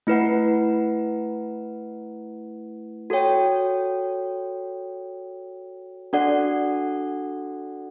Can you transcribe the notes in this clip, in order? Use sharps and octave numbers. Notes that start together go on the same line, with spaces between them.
A3 E4 B4 F#5
F#4 A4 C#5 G5
D4 F#4 A4 D5 F#5